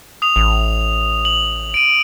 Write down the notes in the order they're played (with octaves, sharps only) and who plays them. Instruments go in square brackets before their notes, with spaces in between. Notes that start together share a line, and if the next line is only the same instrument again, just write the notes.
[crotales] D#6 F7
[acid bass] A1
[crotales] F#7
D7 D#7